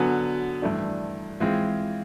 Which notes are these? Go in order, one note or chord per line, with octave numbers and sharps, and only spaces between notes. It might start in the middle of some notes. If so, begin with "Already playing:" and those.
Already playing: D3 F#3 B3 G#5
G2 E3 A3 D4
E3 G#3 C4 F4